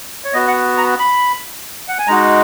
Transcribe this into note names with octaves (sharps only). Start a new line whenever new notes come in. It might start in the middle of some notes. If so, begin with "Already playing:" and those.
C#5
B3 F#4 D#5
F#5
A#5
B5
F#5
G#5
G#3 D#4 F#4 A#5